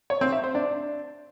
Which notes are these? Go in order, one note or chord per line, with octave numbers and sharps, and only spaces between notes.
C#5
C4
E5
C5
D4